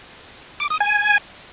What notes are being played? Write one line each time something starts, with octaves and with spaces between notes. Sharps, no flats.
D6
D#6
G#5